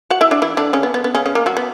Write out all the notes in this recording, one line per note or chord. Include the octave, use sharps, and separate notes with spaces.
F#4 F#5
E4 E5
D4 D5
E3 E4
D3 D4
C#3 C#4
B3
B3
B3
C#3 C#4
C#3 C#4
A#3 A#4
F#3 F#4
B3